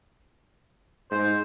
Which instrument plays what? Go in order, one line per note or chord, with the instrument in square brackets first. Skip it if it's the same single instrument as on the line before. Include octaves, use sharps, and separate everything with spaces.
[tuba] G#2 [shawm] C5